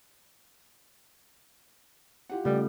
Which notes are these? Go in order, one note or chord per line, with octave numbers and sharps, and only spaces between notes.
F4 G4 F#5
C#3 G3 A3 A4